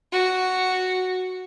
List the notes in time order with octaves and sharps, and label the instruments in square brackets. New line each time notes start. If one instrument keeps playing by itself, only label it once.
[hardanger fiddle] F#4